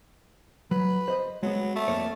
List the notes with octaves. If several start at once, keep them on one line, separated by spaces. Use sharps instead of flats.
F#3 B4
C5 D#5
F#3 G#3 B3
A3
F2 A#3 C#5